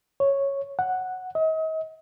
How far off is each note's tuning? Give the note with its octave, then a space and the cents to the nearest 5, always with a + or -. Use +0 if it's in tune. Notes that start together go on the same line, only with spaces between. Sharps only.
C#5 -5
F#5 +0
D#5 +40